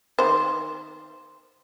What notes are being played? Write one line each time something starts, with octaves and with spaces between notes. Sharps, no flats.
D#3 C5